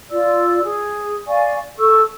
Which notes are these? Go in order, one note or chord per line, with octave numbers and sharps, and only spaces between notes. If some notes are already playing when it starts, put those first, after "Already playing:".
F4 D5 E6
G#4
D5 F5 G#5 C#6
A4 C#6 E6